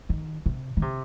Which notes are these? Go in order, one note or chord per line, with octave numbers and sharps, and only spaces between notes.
D#3
C3
D#3
C3